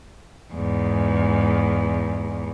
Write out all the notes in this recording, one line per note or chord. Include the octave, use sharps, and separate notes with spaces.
E2 G#2